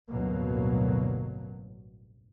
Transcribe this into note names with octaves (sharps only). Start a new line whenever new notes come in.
A1 D2 G2 B2 F#3 A#3